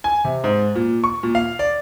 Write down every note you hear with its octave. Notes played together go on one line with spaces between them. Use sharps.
G#5
C3
G#2
A#2
C#6
A#2
F5
D5